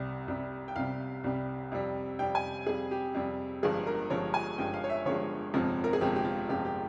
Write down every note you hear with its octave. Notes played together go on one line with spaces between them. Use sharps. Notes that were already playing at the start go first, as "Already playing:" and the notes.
Already playing: C2 C3 G3
C2 C3 G3
G5
C2 C3 G3 F5
C2 C3 G3
F2 C3 G3
F2 C3 G3 G5
G#5
F2 C3 G3 G#4
G4
F2 C3 G3
G1 G2 F3 G#3 G#4
A#4
G1 G2 F3 G#3 C#5
G#5
G1 G2 F3 G#3 G5
F5
C#5
E5
G1 G2 F3 G#3 C#5
G1 F2 C3 F3 G#3
A#4
G#4
G1 F2 C3 F3 G#3 G4
G4
F4
G1 F2 C3 F3 G#3 G4
G4